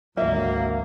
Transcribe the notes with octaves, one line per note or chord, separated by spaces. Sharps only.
G#1 D2 F#3 A#3 E5